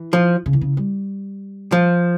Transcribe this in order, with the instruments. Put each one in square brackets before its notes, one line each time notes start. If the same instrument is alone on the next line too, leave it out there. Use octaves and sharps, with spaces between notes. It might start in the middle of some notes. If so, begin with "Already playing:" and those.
Already playing: [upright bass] E3
[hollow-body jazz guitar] F3
[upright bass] C#3
E3
C#3
G3
[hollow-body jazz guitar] F3